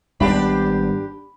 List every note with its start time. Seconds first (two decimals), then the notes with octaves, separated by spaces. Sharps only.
0.20 G#1 G3 B3 D4 G4 B5